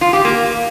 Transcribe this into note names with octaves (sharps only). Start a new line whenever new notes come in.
F4
G4
A#3